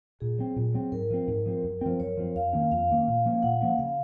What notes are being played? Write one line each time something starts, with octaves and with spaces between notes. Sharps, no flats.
A#2 G#4
F#3 C4
A#2
F#3 C4
G#2 A#4
F3 C4
G#2
F3 C4
F#2
F3 C4
F#2 C#5
F3 C4
F2 F5
D#3 A#3 C#4
F2 F5
D#3 A#3 C#4
A#2
F3 A#3 C#4
A#2 F#5
F3 A#3 C#4
C#3 F5